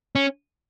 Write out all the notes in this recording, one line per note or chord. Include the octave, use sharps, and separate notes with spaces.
C#4